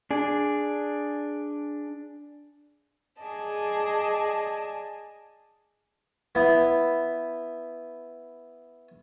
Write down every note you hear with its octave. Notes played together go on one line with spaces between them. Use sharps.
D4 G#4
G#4 D5 D#5 A5
B3 E4